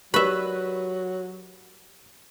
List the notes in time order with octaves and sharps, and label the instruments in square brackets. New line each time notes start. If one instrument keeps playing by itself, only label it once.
[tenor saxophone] F#3 [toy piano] G4 A#4 D5 [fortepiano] B4 [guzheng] E5 B5